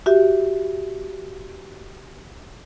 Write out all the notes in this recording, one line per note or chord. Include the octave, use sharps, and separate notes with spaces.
F#4 G4 E5